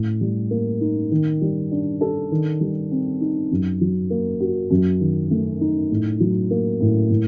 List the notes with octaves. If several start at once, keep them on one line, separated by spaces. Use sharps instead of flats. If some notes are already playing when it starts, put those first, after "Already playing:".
Already playing: A2
G3
A#3
D#4
D#3
G3
D4
A4
D#3
G3
C4
D#4
F#2
F#3
A#3
F#4
F#2
D#3
A3
D#4
A2
F#3
A#3
A2
A2